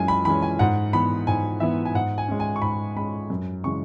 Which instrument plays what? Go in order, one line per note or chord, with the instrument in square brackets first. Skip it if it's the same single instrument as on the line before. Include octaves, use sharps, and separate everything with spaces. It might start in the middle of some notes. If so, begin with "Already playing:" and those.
Already playing: [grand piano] F#2 E3 G#3 C#4 G#5
B5
E3 G#3 C#4 B5
G#5
G#2 F#5
E3 B3 B5
G#2 G#5
E3 B3 E5
G#5
G#2 F#5
G#5
G#3 C#4
G#5
C#6
G#2 B5
G#3 C#4 B5
F#2
C#3 E3 G#3 C#6